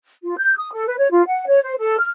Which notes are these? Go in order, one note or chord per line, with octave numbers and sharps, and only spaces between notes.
F4
G6
D#6
A4
B4
C#5
F4
F#5
C#5
C5
A4
F6